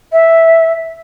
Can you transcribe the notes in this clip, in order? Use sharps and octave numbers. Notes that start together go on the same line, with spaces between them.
E5